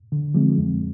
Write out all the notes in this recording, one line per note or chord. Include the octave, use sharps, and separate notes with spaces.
D3
F3 G#3 C4
F2